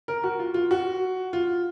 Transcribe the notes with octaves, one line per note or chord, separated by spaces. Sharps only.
A#4
F#4
F4
F4
F#4
F4